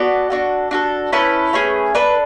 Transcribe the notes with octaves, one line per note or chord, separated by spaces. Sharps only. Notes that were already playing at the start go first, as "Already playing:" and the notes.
Already playing: B3 F#4 A4 D5
D4 F#4 A4
D4 F#4 A4
C#4 E4 A4 B4
A3 C#4 G#4
D4 A4 B4